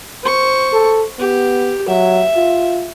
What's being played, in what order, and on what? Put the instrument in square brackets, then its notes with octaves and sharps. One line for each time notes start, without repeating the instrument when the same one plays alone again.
[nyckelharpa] C5 C#6
[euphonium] A4
[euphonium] B3 [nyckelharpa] G4
[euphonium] F#3 [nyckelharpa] E5
[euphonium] F4